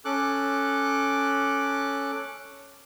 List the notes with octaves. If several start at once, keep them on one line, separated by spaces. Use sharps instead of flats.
C#4 A4 D6 F#6